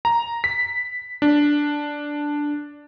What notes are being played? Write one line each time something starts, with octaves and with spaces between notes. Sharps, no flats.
A#5
B6
D4